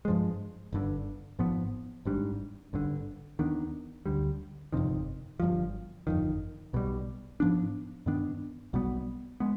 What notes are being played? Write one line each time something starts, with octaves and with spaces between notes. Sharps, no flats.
G2 F3 G#3
G1 G2 D3
G#1 G#2 F3 B3
G#1 G#2 G3 D4
G#1 G2 D3
D#2 D#3 B3 D4
D2 D3 G3
G1 F2 C3 D#3
G1 G2 F3
G1 F2 D#3
B1 B2 G3
G#2 F3 B3 D4
G2 D#3 B3 D4
B1 B2 G3 B3
G#3 B3